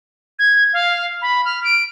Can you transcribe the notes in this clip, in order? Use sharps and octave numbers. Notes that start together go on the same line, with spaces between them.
G#6
F5
B5
F6
D7